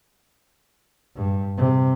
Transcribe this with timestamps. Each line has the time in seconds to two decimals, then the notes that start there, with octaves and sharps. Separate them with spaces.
1.15 G2
1.57 C3